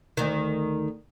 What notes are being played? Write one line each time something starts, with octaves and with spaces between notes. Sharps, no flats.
D2 D#3